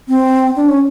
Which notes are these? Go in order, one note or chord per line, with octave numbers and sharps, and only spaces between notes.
C4
D4
C#4